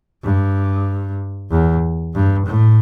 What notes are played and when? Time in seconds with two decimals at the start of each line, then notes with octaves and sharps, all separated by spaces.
0.23 G2
1.51 E2
2.14 G2
2.46 A2